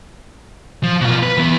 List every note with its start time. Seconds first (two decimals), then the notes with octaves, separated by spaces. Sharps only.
0.83 F3
1.01 B2 F4
1.23 B4
1.37 E3 B3